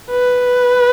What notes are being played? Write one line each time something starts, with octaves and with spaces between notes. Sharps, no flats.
B4